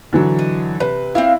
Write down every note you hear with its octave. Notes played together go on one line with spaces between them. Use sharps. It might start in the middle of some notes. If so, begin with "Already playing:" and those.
D3 E3 F#3
D#5
C3 B4
C4 D4 E4 F5